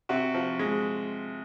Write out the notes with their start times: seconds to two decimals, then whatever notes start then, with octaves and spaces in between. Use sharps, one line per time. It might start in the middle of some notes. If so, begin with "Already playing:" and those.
0.09 C3 F#4
0.34 F3
0.59 G#3